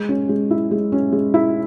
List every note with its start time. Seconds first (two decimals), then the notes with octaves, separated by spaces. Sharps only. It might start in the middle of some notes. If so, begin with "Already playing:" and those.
Already playing: G#3
0.09 C#4
0.29 G#3
0.51 E4
0.71 G#3
0.92 C#4
1.12 G#3
1.34 E4